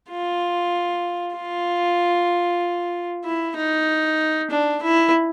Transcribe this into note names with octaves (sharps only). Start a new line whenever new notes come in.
F4
F4
E4
D#4
D4
E4